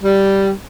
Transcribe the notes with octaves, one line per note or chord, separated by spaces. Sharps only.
G3